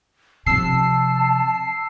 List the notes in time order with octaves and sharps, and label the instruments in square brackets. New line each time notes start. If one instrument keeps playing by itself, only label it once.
[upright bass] C3 F3 [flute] A5 [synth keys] E6 C7